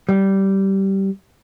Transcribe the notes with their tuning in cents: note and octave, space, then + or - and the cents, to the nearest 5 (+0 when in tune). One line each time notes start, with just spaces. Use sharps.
G3 -15